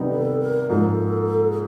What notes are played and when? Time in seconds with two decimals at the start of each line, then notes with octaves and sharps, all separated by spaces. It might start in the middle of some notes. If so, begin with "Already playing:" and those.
Already playing: C3 D#3 G3 B3 D#4
0.10 A4
0.40 A#4
0.69 G#2 F3 A#3 A4
1.51 G#4